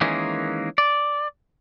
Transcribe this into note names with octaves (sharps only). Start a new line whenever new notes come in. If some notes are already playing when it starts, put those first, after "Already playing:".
D#3 E3 G#3 A#3 C#4
D5